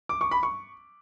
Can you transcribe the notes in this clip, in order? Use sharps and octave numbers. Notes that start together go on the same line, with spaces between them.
D6
C#6
B5
C#6